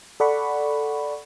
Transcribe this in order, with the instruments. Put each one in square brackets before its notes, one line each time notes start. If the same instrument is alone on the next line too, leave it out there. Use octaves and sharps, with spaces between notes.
[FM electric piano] A4 D5 F#5 B5 C#6